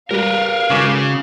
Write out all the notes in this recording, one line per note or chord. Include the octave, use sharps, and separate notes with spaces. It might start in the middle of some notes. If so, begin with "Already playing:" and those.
G3 A#4 B4 F5
G#1 C#3 D6